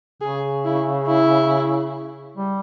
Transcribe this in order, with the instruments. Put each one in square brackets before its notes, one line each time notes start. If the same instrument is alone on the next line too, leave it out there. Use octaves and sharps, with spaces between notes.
[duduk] C#3 [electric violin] G#4
[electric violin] E4
E4
[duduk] G3